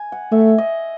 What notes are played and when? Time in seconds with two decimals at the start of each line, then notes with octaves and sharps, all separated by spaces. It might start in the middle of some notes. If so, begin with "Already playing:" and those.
Already playing: G#5
0.12 F#5
0.32 A3 E5
0.58 D#5